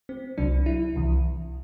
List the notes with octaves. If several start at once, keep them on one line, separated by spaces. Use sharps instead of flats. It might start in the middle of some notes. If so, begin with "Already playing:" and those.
C4
C2 C3 F#3 D4
E4
C2 C3 E3